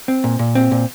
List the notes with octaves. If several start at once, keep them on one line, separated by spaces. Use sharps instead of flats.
C4
A#2
A#2
C4
A#2